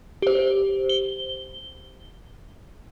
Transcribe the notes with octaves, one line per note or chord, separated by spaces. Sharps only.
G4 C5
G7